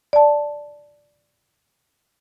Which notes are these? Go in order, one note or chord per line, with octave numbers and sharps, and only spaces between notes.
D5 A5